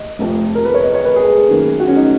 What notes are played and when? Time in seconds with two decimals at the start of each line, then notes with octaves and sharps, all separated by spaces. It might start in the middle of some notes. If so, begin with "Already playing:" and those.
Already playing: D#5
0.19 F1 F2 F3
0.55 A#4
0.65 B4
0.74 C#5
0.83 D#5
0.94 C#5
1.05 B4
1.16 G#4
1.48 F#2 D#3 A#3
1.80 F#4
1.88 C#4
1.96 D#4